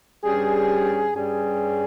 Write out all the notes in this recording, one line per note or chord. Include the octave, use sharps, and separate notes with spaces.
G2 G3 C#4 G#4
G2 G3 C#4 G#4